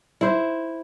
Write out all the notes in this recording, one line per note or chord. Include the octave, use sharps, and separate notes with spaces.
E4 C5